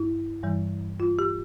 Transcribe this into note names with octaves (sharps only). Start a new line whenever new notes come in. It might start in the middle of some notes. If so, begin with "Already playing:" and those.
Already playing: G2 E4
G2 E3 G3
F4
G4